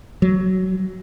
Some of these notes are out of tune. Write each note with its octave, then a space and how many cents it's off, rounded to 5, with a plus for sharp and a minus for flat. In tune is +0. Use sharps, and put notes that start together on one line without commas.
F#3 +15